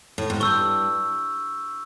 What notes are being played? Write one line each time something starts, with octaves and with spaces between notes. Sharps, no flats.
A2
G#2
G2 C#6 E6 G6